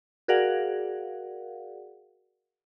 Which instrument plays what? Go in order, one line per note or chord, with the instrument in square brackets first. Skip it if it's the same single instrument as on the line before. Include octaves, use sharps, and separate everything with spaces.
[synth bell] F#4 G#4 A#4 D5 F5 F#5